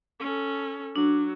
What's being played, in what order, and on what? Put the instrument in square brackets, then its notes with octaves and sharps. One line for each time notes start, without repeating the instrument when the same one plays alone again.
[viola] C#4 A4
[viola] F#3 [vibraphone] D4